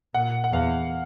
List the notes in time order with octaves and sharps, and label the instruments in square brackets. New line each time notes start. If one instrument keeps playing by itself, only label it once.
[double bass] A#2 [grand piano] F#5
[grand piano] F#5
[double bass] E2 [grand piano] F5